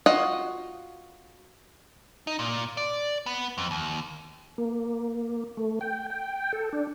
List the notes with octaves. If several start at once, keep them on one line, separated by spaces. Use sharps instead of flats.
F4 F#4 D#5 F#5
D#4
A#2
D5
B3
F2
D#2
A#3
A3
G5
G5
A4
D4